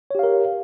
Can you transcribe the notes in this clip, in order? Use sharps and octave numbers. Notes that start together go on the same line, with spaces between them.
G4 A#4 C#5 F5